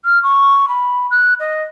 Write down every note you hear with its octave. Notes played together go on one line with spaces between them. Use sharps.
F6
C#6
B5
F#6
D#5